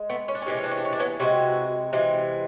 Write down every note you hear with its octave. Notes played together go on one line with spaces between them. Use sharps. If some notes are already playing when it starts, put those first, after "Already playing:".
Already playing: G#3
A3 B3
C#4
D4
C#4
C3 E3 G#3 D4
C#4
D4
C#4
D4
C#4
D4
B3 C#4
C3 E3 G#3 E4 F#4
C3 E3 G#3